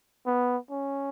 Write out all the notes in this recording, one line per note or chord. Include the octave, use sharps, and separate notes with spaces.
B3
C#4